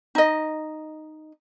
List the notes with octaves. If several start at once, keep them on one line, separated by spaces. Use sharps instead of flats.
D#4 D#5